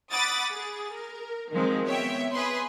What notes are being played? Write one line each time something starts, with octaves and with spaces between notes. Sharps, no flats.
F#5 B5 D6 D#6 A6
G#4
A#4
D#3 F3 F#3 G#3 C4
B3 C#5 E5 G5
G#4 B4 C6